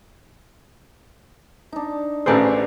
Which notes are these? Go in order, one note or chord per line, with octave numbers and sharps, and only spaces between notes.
D4 D#4
A1 A3 G4 G#4 B4 C5